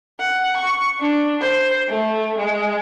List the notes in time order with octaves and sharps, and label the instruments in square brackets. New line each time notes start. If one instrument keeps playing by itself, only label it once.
[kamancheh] F#5
C#6
D4
C5
A3
G#3